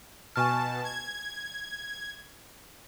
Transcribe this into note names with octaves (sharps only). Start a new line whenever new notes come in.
B2 G#5 A5 C#6 F6
G#6